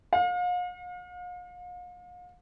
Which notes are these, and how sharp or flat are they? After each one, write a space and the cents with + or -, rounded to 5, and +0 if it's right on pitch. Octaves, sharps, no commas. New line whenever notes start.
F5 +40